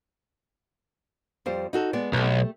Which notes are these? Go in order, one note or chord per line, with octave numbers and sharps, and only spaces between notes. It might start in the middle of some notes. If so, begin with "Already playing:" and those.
F2 G3 C5
D#4 F#4 A4
G#3 B3 D5
B1 A3 G4